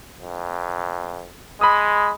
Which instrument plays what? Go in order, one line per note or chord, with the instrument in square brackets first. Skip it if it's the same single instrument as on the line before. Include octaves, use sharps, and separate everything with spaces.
[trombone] F2
[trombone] G#3 [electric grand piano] B5 D#6